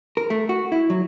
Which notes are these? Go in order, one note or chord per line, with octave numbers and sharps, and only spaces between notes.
A#4
A3
F#4
E4
F#3